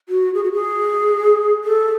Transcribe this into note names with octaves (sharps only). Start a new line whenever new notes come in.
F#4
G#4
F#4
G#4
A4